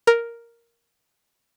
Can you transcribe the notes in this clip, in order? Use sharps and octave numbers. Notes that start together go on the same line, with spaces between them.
A#4